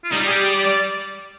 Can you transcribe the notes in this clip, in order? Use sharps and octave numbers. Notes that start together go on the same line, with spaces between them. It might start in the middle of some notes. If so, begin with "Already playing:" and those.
F4
G3 D#4
G#4
G4
D5
D5